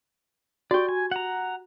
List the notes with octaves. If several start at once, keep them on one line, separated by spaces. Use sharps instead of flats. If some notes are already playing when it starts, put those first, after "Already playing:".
F#4 G4 D5 G5
G#5
F#5 A#5